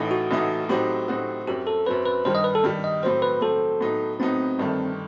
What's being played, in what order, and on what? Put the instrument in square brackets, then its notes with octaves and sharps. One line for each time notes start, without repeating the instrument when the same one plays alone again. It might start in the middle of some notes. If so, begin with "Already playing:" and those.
Already playing: [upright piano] A1 A2 E3 A3 D#4
[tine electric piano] F#4
[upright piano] A1 A2 E3 A3 D#4
[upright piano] A2 F#3 C4 D#4 F#4 [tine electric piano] G4
[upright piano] A2 F#3 C4 D#4 F#4
[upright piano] F#2 F#3 C4 [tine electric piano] G4
[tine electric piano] A4
[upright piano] F#2 F#3 C4 [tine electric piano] B4
[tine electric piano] B4
[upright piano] G2 D#3 G3 [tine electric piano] C5
[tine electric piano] D#5
B4
A4
[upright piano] G2 D#3 G3
[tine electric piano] D#5
[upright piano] A2 F#3 C4 [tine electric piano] C5
[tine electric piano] B4
[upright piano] A2 F#3 C4 [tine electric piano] A4
[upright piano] A2 F#3 B3 D#4
[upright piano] A2 F#3 B3 D#4 [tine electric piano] C4
[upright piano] G1 G2 D#3 A3